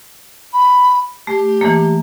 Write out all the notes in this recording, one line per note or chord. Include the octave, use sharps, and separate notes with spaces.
B5
A3 G4
E3 A3 A#3